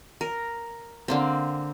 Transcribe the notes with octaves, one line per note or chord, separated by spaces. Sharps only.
A#4
D3 A#3 C4